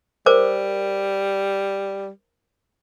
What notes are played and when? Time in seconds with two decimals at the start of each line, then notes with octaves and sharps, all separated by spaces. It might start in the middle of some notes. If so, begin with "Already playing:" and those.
0.26 G3 A#4 C5 D6